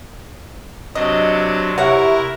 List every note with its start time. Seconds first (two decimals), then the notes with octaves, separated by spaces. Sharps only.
0.95 C3 F#3 D4 D#5
1.78 C3 E4 A#4 C#5 F#5 A#5